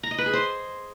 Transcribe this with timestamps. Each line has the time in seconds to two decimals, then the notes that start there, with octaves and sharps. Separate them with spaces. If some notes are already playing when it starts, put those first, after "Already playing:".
0.03 A#5
0.11 D#5
0.18 B4
0.26 G#4
0.33 C5